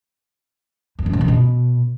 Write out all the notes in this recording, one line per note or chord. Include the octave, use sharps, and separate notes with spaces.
F2
F#2
B2
D3
B2